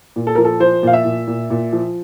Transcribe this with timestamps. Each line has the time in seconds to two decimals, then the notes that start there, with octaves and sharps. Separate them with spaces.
0.16 A#2
0.27 A4
0.35 F3 A#4
0.45 A4
0.60 F3 C5
0.83 A#2 F5
0.93 E5
1.05 A#2
1.27 A#2
1.50 A#2
1.73 F3